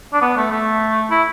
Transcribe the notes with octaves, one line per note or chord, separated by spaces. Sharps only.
D4
B3
A3
A3
E4